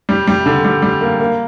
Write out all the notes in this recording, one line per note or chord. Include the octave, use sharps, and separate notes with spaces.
G3
G3
D3
G3
G3
A#3
A#3